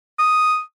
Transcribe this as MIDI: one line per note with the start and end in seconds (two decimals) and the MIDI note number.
0.19 0.60 87